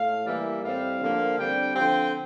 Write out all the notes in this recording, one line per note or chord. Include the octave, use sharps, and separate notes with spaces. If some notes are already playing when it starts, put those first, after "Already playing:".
Already playing: A2 A3 F5
E3 G3 A#3 E5
A2 G3 C4 F5
D3 F3 A#3
D3 G3 C4 G5
D3 F3 C4 G5